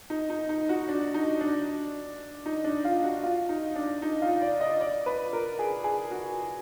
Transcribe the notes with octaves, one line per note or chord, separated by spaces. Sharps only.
D#4
D#4
D#4
F#4
D4
D#4
D4
D#4
D4
F4
F#4
F4
D#4
D4
D#4
F4
D5
D#5
D5
B4
A#4
G#4
G#4
F#4